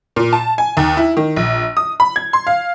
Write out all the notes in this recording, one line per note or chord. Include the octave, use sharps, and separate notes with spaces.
A#2
A5
G#5
D#2
E4
D#3
A#1
D#6
B5
G#6
C6
F5